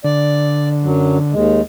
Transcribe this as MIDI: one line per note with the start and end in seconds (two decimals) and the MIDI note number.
0.04 1.35 50
0.04 0.69 74
0.84 1.18 42
0.84 1.18 54
1.33 1.61 39
1.33 1.61 56